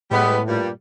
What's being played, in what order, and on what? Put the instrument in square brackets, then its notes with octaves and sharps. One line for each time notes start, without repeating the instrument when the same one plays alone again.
[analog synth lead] A2 [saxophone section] G3 G#3 B3
[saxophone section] G2 A#2 G3